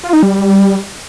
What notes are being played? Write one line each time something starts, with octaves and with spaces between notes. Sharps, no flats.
F4
D#4
G3